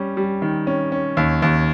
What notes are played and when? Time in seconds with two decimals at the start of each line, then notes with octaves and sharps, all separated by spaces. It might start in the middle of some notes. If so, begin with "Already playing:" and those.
Already playing: G3 C#4
0.17 G3
0.42 D#3
0.67 C#4
0.92 C#4
1.17 D#2
1.42 D#2